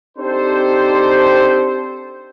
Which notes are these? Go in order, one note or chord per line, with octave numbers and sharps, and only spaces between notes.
C4 D4 D#4 G4 A4 C5